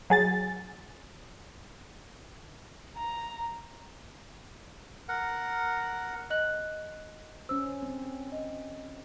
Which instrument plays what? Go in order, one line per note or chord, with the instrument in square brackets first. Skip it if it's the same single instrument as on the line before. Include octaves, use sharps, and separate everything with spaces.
[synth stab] F#3 G#4 A6
[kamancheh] A#5
[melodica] A#4 F#5
[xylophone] D#5 F#6 F#7
[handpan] C#4 C5 [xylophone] E6
[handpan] C4
[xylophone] D#5